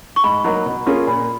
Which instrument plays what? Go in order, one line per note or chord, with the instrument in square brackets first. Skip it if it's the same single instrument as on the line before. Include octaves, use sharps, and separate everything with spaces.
[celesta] C#6
[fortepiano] G#2 [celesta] B5
[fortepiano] F#3 A#3 D#4
B2
A#3 C#4 F4 G#4
[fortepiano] A#2 [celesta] B5